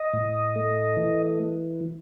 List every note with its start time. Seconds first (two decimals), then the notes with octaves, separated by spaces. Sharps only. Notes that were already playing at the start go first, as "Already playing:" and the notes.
Already playing: D#5
0.13 A2
0.55 A3
0.97 E3